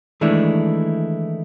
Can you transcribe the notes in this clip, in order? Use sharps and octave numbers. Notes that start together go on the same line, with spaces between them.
D#3 E3 G#3 A3 D4 E4